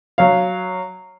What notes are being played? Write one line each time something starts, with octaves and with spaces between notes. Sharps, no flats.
F#3 C#5 F5